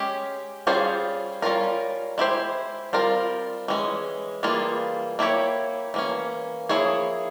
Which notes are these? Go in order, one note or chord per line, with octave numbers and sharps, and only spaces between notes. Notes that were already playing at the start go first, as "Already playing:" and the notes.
Already playing: G#3 C#4 G4
G3 C#4 F4 G#4 C5
G3 C#4 F4 A#4
G#3 E4 G4 C5
G3 C4 F4 A#4
E3 G#3 C#4
E3 G3 A#3 F4 G#4
A#3 E4 G4 C#5
E3 A#3 C#4
F3 A#3 E4 G#4 C#5